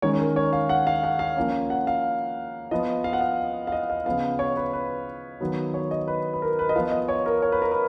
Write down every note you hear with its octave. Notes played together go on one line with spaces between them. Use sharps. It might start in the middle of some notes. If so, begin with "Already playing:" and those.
D#3 G#3 C#4 C#5
A#4
C#5
F5
F#5
F5
F#5
F5
F3 A#3 C#4
F#5
F5
F3 B3 D#5
F5
F#5
F5
F5
D#5
F5
C#3 F3 B3 F5
C#5
B4
B4
D#3 F#3 B3
C#5
D#5
B4
B4
A#4
B4
D#5
F3 B3 F5
D#5
C#5
A#4
C#5
B4
A#4
B4